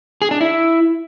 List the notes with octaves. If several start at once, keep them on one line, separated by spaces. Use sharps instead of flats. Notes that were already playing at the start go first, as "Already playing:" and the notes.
G#4
D4
E4